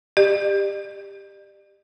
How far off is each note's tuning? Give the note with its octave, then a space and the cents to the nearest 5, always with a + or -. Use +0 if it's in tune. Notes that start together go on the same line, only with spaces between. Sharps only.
G4 +15 D5 +40